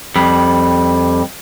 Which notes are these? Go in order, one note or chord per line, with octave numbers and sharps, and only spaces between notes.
F2 G3